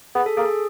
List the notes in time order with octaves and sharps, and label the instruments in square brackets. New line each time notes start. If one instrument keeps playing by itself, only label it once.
[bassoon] B3 [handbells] G#4
[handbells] A4
[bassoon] A#3 [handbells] G#4